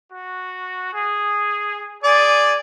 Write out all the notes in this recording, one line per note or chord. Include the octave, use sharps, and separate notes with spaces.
F#4
G#4
G#4 D5 G#5